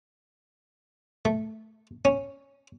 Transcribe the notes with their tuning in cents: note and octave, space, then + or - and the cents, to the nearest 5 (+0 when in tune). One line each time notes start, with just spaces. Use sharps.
A3 -5
C#4 -5